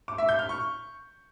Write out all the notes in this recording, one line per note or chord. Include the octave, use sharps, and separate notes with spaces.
D6
E5
G6
F6
C#6